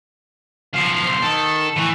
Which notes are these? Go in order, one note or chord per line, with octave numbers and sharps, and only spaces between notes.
B1 F3 F5
C5
D#3 A4
A2 E3